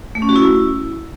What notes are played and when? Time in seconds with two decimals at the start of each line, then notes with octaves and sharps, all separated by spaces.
0.15 A3
0.22 C#4
0.29 F#4
0.36 E4